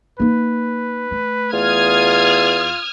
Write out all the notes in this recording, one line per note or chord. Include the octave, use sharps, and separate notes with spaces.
A#3 D#4 B4
A3
E2 F4 D#6 F6 G#6